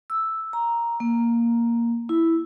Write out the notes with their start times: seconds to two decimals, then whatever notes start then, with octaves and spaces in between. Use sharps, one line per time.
0.10 E6
0.53 A#5
1.00 A#3
2.09 E4